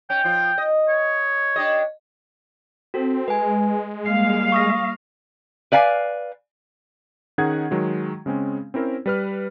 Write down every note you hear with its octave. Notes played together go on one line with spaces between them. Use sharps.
C#4 G5
F3 F4
D#5
C#5
D4 G4 D#5
C4 F#4 A4
G#3 B4 G#5
G3 A#3 F5 C7
C#6 D#6 A#6
B4 D5 F5 G#5
D#3 C#4 D#4 G#4 F#5 G#6
D#3 F#3 G#3
C#3 G#3 C4 C#4
C4 C#4 E4 A#4 C5
G3 B4 F6